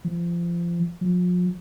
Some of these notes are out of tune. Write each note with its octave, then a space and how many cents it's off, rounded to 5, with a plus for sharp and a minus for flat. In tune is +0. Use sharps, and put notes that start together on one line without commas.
F3 -25
F3 +40